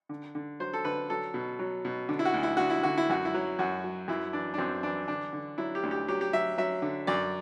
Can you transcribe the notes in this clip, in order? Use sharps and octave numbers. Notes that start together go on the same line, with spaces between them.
D3
D3
F#3 C5
A4
D3 B4
F#3 A4
B2
F#3
B2
D3
E4
F#4
D2
E4
D2 F#4
E4
D3 F#4
E4
F#2 F#4
E4
F#3
F#2 F#4
F#3
F#2 E4
E3 D4
D4
F#2 C4
E3 D4
D3 D4
D3
F#3 E4
G4
D2
G4
F#3 G4
G4
F#3 E5
F#3 E5
D3
F#2 D5